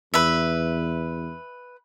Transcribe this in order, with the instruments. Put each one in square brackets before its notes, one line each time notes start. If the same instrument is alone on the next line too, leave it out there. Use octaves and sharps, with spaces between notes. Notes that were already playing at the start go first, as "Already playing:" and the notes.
[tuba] E2 [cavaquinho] B4 E5